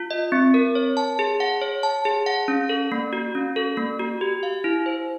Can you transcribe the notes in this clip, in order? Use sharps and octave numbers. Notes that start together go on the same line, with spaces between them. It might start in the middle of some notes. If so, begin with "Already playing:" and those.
Already playing: F4
D#5
C4
A#4
C#5
A5
G#4
F#5
C#5
A5
G#4
F#5
C#4
A4
A#3
F#4
C#4
A4
A#3
F#4
G4
F5
E4
C5